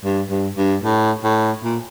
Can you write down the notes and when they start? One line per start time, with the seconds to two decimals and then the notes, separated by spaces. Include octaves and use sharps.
0.04 G2
0.30 G2
0.57 G2
0.83 A2
1.24 A2
1.64 A#2